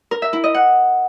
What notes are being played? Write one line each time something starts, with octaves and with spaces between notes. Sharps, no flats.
A#4
E5
E4
D#5
F#5